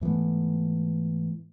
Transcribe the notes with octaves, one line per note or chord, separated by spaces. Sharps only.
G#2 E3 A3 B3